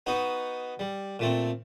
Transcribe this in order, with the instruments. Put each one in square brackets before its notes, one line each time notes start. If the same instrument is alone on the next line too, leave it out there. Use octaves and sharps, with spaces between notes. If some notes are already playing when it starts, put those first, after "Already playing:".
[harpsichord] B3 D#4 F#4
G3
A#2 A3 C4